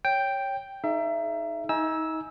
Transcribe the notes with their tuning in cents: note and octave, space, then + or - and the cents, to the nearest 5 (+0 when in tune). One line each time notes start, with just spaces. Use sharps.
C#5 +0 G5 +0
D#4 +0 G#4 +30 E5 +30
D#4 +30 G#5 +5 E6 -10